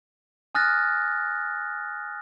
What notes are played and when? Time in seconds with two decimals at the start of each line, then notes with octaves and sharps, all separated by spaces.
0.55 G#5 D#6 F6 F#6 A6 A#6